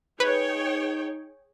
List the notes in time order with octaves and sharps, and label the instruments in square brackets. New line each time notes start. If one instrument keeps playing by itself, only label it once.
[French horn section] D#4 [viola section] G#4 C#5 G5 [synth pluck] B4